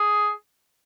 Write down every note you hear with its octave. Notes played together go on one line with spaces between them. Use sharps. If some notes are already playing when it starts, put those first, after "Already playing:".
Already playing: G#4